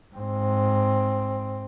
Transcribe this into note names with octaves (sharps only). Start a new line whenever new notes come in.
G#2 C4